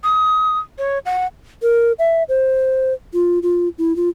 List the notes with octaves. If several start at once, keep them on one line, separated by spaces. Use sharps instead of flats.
D#6
C#5
F#5
A#4
E5
C5
F4
F4
E4
F4